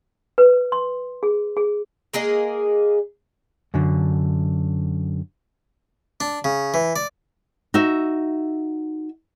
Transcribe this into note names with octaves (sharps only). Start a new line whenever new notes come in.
B4
C6
G#4
G#4
G#3 A#3 G#4 D#5
F#2 D3
D4
C#3
E3
D5
D#4 F#4 E5